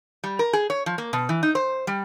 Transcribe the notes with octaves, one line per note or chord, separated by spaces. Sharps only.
G3
A#4
G#4
C#5
F3
A#3
B2
E3
D#4
C5
G3